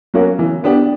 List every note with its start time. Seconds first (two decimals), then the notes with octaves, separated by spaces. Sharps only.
0.14 F#3 A#3 C#4 F#4
0.39 E3
0.64 B3 D4 G4